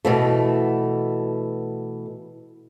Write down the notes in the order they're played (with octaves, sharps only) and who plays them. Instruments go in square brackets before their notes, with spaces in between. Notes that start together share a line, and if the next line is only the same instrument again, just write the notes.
[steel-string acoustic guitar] B2 E3 A3